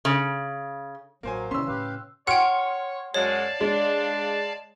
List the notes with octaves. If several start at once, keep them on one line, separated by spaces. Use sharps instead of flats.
C#3
A1 F#3 A#3 C5 G#5
C3 D#3 E3 G3 C#4 C6 E6
A2 C#3 G4 B4 F5
C#5 F#5 G5 C6 F6 C#7
F#2 F#3 G#3 C#5 D5 F5 A5
G#3 D4